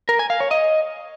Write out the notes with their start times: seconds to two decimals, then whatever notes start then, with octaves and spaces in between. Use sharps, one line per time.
0.09 A#4
0.19 G#5
0.30 F5
0.40 C#5
0.51 D#5